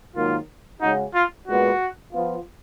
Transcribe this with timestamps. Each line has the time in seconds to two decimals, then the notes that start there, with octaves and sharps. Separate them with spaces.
0.15 G#2 D#3 F#3 A#3 F4
0.81 C#3 G#3 C#4 D#4 F#4
1.14 F4
1.48 A#2 G#3 B3 F#4
2.14 F3 B3 F4